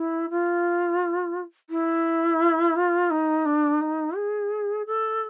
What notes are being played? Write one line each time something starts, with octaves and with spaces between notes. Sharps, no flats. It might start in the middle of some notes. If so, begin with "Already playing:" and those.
Already playing: E4
F4
E4
F4
D#4
D4
D#4
G#4
A4